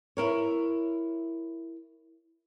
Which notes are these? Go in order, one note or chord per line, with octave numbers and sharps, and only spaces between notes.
E4 A#4 C#5